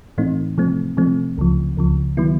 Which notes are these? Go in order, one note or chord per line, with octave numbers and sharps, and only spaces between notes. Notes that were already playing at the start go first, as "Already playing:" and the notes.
A2 E3 A3 C4 D#4
C3 F3 A3 C4
C3 F3 A3 C4
C#2 C#3 F3
C#2 C#3 F3
D#3 F#3 B3 E4